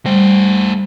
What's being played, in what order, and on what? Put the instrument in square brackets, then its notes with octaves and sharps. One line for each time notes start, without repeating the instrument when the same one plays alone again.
[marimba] G3 [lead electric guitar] A3 C5